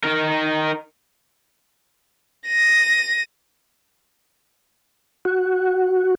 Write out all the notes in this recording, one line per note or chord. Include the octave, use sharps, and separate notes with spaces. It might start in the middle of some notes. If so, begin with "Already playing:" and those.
D#4 A#4
A#6 D#7
F#4